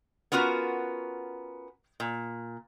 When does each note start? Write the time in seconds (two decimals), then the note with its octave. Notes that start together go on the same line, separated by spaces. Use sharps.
0.32 B3 C#4 F4 F#4 A#4
2.00 A#2